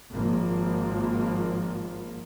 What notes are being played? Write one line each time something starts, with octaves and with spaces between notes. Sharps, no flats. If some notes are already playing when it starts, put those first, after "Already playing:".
G#1 F3 A#3